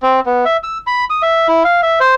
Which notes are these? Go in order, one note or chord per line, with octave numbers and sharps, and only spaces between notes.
C4
B3
E5
E6
B5
D#6
E5
E4
F5
E5
C5